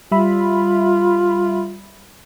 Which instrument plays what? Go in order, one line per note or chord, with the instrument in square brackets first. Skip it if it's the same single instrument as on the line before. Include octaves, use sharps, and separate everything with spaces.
[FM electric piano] G3 E5 B5 [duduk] F4